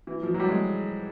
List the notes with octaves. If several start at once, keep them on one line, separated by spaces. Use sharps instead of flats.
E3
F3
F#3
G3
G#3